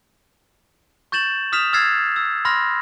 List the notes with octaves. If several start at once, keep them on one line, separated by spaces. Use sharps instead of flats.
C#6 G6 A6 E7 F#7
D#6 F6 B6 E7 F7
E6 F6 G#6 A6 C7
E6
B5 C6 F6 A#6